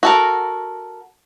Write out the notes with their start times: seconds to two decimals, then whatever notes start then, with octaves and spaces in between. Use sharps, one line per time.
0.03 F#4 A4 A#4